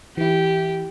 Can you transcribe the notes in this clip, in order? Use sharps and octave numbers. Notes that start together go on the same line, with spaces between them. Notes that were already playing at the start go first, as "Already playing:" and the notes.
E3 E4 G4